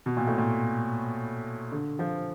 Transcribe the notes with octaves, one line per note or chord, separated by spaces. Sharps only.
B2
A#2
A2
A#2
D3
F3